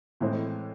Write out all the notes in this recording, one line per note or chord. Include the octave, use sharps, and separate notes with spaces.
A2 E3 G#3 C4